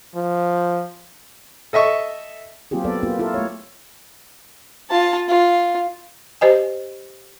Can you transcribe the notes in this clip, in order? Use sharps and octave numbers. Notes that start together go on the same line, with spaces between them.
F3
A4 D#5 E5 C#6
F#3 A#3 C4 F4 G4 G#4
F#3 B3 A4 D5
A#3 B3 F4 G4
E4 F4 A4 A#4
A3 C#5
F4 A5
F4
G4 C5 D#5 G#5